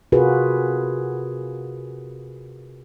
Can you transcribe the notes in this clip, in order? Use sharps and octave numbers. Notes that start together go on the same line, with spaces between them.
C3 F4 F#4 G#4 A#4 B4